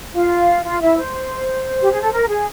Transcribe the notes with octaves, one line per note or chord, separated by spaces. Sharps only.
F4 F5
F4 F5
E4 E5
C5
G4
G#4
A4
A#4
G#4